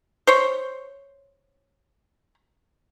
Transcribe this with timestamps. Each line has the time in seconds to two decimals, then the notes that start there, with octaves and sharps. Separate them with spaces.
0.27 C5 C#5